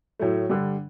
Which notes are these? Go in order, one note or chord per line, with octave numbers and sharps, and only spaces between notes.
A2 F#3 A3
G2 D3 G3